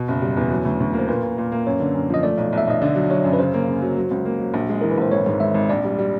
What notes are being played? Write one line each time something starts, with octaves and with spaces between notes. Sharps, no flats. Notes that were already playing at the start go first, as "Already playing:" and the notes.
Already playing: B2
F#1
G3
E2
F#3
D2
D2
A#3
C5
A#2 B4
A#2
A#2
A#3
F#2 C#5
D3
F#2
F3 D#5
A3 D5
B1
B1 E5
B1 D#5
D3 D5
F#3
F#3 C#5
F#2
B4
C#3 C5
A#3
C#3
F#3
F#3
C#2
A#3
F#3
A#1
G#3
E3 A#4
B4
A#1 C5
G#1 C#5
G#2
G#1 E5
G#1
A#1 D5
G3
G3